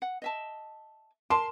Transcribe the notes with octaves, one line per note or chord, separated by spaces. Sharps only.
F#5
D#5 E5 A5
A#4 A5 C6